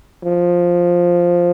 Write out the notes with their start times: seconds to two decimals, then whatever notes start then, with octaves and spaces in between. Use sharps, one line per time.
0.24 F3